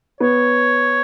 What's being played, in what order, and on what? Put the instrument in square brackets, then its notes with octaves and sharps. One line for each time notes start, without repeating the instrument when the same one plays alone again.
[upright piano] B3 [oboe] C#5